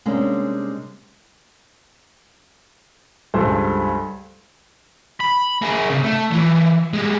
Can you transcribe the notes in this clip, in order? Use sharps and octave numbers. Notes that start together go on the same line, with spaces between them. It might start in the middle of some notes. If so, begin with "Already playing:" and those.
C3 G3 G#3 A#3 C#4 D4
C#2 G2 A4 C5
B5
A#3 G#4
C#2 C3
A3
E3 F3
G3 G#3